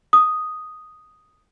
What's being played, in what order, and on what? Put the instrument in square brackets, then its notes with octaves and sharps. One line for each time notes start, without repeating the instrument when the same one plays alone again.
[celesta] D#6